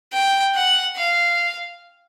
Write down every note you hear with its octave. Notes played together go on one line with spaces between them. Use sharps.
G5
F#5
F5